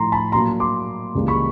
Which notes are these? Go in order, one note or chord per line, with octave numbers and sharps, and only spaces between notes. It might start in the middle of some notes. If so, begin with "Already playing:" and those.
Already playing: A2 F3 A3 A#5 C6
A5 B5
A#2 F#3 A#3 A#5 C6
C6 D6
C#2 C#3 E3 G3 A#3
B5 C#6